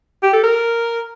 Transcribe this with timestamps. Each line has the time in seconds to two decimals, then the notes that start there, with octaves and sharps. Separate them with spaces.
0.23 G4
0.33 A4
0.43 A#4